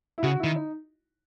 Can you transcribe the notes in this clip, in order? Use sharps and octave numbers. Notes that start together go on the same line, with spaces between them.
E4
C#3 F#4
D#3 E4
D#4